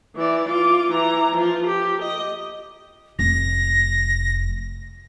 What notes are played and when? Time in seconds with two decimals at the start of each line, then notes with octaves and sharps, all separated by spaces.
0.16 E3 D5
0.49 F4 D6
0.92 E3 A#5
1.35 F3 F4
1.67 G4
2.02 D#5
3.19 F1 A#6